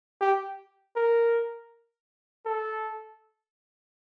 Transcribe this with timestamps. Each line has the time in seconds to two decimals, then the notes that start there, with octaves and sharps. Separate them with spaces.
0.21 G4
0.96 A#4
2.46 A4